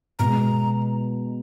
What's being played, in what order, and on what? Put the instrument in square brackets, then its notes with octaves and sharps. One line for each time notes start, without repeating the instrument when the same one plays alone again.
[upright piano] B2 G#3 B3 [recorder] A#5